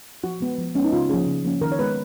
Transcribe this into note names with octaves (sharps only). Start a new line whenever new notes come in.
F3 F#4
G#3 B3
F3
G#3 B3 C#4
D#4
C#3 F4
F3 A#3 C#4 G#4
C#3
F3 A#3 C#4
D#3 A#4
C#5
G#3 B3 B4